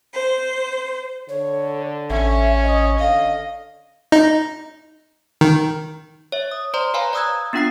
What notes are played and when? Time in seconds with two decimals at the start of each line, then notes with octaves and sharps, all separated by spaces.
0.12 C5
1.29 D3 C#5
2.10 A1 C#4 E5
2.64 C#5 D#5
2.99 D3 D#5 F5
4.12 D#4
5.41 D#3
6.32 C#5 E5
6.51 D#6
6.74 C5 D5 A#5 C6
6.94 B4 C#5 F5 G#5 A#5 B5
7.13 D5 A#5 D#6 E6 F#6 G#6
7.53 B3 D4 F4 F#5 D#6 C7